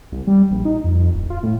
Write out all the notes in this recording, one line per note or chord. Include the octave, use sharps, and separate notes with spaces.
C2
G3
A#1
D#4
F2
D1
F4
A2